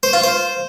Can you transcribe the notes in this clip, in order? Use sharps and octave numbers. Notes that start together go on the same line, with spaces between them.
C5
F4
C5